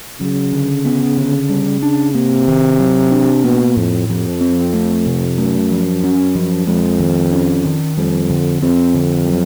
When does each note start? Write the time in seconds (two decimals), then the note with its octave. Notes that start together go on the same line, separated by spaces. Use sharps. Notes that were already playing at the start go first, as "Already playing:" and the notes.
0.20 C#3 F#3
0.53 D3
0.85 B3
1.17 D3
1.49 G3
1.83 D4
2.14 C3 A#3
2.48 D#3
2.79 F#3
3.11 D4
3.44 B2 A#3
3.76 F2 A2
4.09 F2 F3
4.41 C4
4.73 A3
5.06 C3
5.38 F#2 A3
5.71 F3
6.04 C#4
6.35 F3
6.67 F2 G#3
7.00 D#3
7.33 C#4
7.65 D#3
7.97 F2 G3
8.30 D3
8.62 F2 C4
8.94 D3
9.26 F#3